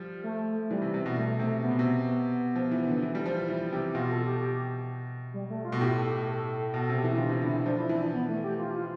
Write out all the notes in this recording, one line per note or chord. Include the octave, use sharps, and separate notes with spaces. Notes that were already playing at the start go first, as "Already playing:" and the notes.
Already playing: F3 G3
A3
E3 G3
C3
C3
B2
B2 A3
C3 A3
C3 B3
B2
C3
B3
F3
E3
D3
E3
G3
F3
E3
C3 G4
B2 F4
A4
G4
G4
G3
A3
F4
B2
A2 G4
A4
G4
A4
B2 A4
C3
G4
E3
E4
D3 F4
C3
D3 E4
F3 D4
E4
E3 E4
D4
B3
A3
G4
F4
F4